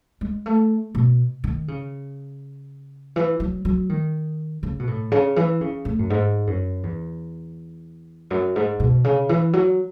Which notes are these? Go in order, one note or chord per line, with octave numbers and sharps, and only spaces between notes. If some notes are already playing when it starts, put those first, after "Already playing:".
G#3
A3
B2
D#3
C#3
E3
F#3
F#3
D#3
C#3
B2
A2
C#3
E3
C#3
A2
F#2
G#2
F#2
E2
F#2
G#2
B2
C#3
E3
F#3